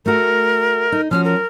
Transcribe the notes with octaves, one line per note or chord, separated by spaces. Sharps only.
A3 F#4 A#4
D#4
F3 C#4 F#4 F6
A#4